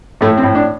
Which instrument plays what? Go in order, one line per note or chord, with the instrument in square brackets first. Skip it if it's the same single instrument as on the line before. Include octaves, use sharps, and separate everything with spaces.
[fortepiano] A2 A3
C4
A2
D4